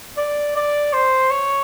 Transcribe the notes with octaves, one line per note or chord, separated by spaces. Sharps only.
D5
D5
C5
C#5